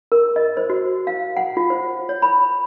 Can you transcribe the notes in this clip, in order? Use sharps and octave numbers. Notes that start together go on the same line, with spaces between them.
A#4
D#5
C5
F#4
F5
F#5
F4
C5
C#5
B5